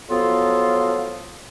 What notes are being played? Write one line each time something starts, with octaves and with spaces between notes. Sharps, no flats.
F3 F#3 B3 F4 A4 F5